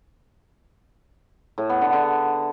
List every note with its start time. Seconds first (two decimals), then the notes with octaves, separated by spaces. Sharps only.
1.58 A2
1.70 B3
1.81 D3
1.93 D3